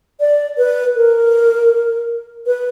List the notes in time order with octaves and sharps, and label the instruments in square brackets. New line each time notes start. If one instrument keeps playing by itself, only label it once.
[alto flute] D5
B4
A#4
B4